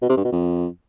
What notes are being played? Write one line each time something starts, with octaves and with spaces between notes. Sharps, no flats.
B2
C3
G2
B2
F2